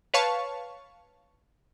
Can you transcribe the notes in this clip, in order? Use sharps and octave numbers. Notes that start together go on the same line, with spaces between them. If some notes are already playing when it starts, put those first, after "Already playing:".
B4 C#5 F5 A5 C#6